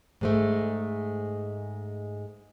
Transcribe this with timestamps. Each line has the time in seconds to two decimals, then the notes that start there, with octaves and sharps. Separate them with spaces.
0.21 G#2 G#3 A3